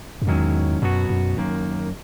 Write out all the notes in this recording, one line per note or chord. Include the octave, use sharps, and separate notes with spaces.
F#2
E2 G#2 D#3 F#3 C#4 E4
F#2 B2 F#3 B3 F#4
F#2
F#2 D#3 A#3